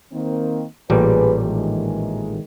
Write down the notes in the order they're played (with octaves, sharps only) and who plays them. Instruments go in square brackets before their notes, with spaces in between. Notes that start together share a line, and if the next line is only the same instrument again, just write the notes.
[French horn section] D#3 A#3 C4
[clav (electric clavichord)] A1 A#2 G3 [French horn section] G#4 B4
[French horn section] D#3 E3 G#3